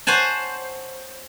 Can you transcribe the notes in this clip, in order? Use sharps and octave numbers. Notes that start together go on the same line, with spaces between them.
C5 C#5 F#5 G#5 A5